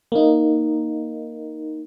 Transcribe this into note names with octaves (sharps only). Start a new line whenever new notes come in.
A#3 D#4